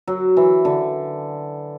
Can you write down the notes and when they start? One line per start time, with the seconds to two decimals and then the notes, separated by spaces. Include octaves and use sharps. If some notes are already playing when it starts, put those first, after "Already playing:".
0.07 F#3
0.37 E3
0.65 D3